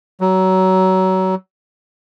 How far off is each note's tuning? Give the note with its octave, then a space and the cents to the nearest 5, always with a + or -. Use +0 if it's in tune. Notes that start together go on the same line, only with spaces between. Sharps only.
F#3 +25